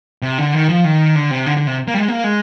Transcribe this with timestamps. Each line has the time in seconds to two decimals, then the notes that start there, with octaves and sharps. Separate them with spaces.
0.22 C3
0.38 D3
0.54 D#3
0.69 F3
0.85 D#3
1.16 D3
1.31 C3
1.46 D3
1.57 D3
1.67 C3
1.88 A#3
1.94 G3
1.98 G#3
2.08 A#3
2.24 G#3